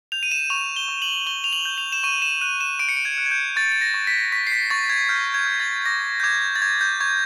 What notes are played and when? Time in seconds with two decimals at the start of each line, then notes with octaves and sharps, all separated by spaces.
0.12 G6 F7
0.23 D#7
0.31 E7
0.50 C#6 F7
0.76 G7
0.88 C#6
1.02 F#7
1.26 C#6 G7
1.44 F7
1.53 F#7
1.65 G6
1.78 F7
1.93 E7
2.03 C#6 D#7
2.22 E7
2.41 F#6 D#7
2.61 E7
2.79 C#6 D7
2.89 C#7
2.97 D7
3.05 G#6
3.18 F#6
3.26 G#6
3.31 G6
3.56 C#6 A6
3.72 A6
3.81 A#6
3.94 C#6
4.07 B6
4.32 C#6 B6
4.47 C7
4.52 B6
4.70 C#6 A6
4.90 G#6
5.09 F6 G6
5.34 G#6
5.47 F6
5.60 A6
5.86 D6 A#6
6.20 G6
6.23 D6 G#6
6.56 A6
6.62 C#6 G#6
6.81 G6
7.00 C#6 G#6